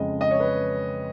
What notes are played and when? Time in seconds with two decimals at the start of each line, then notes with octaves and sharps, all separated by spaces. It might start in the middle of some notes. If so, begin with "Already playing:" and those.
Already playing: F2 C#3 G#3 D#5
0.21 D#5
0.31 C#5
0.40 B4